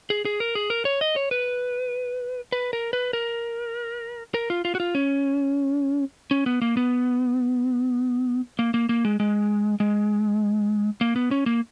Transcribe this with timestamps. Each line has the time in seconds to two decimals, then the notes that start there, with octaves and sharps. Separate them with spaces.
0.10 G#4
0.25 G#4
0.40 A#4
0.55 G#4
0.70 A#4
0.85 C#5
1.01 D#5
1.16 C#5
1.31 B4
2.52 B4
2.73 A#4
2.93 B4
3.13 A#4
4.34 A#4
4.50 F4
4.65 F4
4.75 F#4
4.80 F4
4.95 C#4
6.31 C#4
6.46 B3
6.62 A#3
6.77 B3
8.59 A#3
8.74 A#3
8.89 A#3
9.05 G#3
9.20 G#3
9.80 G#3
11.01 A#3
11.16 B3
11.31 C#4
11.46 A#3